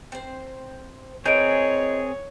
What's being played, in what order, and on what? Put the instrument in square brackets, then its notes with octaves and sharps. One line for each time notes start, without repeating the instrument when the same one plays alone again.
[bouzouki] C4 C5
[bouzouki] E3 G#3 [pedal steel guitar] C4 G#4 A#4 [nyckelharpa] C#5 [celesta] G6 D7